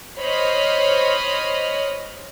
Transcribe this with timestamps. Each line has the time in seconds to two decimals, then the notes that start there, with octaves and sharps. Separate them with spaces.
0.19 C5 C#5 D#5 B5 F6